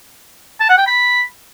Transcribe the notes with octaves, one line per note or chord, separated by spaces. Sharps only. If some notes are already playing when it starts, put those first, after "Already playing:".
A5
F#5
G5
B5